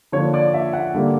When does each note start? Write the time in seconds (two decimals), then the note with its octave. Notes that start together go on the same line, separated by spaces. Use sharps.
0.12 D3 F3 A#3 D4 C#5
0.34 D5
0.54 E5
0.73 F#5
0.95 D3 G3 A#3